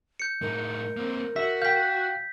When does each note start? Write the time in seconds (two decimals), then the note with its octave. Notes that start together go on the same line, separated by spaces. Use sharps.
0.20 G6 C#7
0.42 A2 D#4 A#4
0.97 A#3 C4
1.36 F#4 E5 B6
1.62 F5 G5 G6 B6